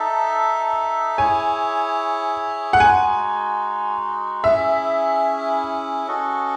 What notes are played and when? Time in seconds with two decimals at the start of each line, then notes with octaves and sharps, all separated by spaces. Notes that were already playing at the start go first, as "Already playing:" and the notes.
Already playing: D#4 A4 E5 A5
1.18 E4 G#4 C#5 G#5
2.73 F#5
2.80 G#3 D#4 F#4 G#5
4.44 C#4 E4 G#4 E5
6.07 C#4 F#4 A4 D#5